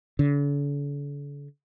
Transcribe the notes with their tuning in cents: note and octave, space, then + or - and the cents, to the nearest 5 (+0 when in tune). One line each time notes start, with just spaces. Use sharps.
D3 -45